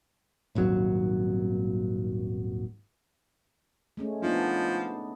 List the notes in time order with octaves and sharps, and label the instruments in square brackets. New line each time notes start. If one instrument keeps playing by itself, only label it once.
[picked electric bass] D#1 G#1 D#2 F#3
[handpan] G#3 A3 C#4
[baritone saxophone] F3 [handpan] B3 D4 D#4